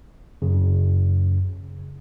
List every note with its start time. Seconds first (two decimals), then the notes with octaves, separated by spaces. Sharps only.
0.42 F#2 C#3